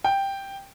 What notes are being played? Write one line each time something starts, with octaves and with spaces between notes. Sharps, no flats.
G5